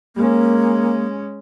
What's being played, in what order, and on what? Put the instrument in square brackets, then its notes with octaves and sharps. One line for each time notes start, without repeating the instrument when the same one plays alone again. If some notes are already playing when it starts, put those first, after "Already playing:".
[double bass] G#3 C#4 [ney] A#3